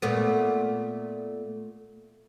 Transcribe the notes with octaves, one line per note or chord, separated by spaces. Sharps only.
A#2 A3 B3